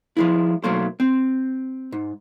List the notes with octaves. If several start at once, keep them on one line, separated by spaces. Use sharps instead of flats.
F3 G#3 E4
B1 F#3 A3 A#3 C5
C4
G#2